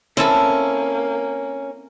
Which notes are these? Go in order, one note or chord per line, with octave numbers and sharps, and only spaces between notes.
A#3 C4 C#4 E4 A4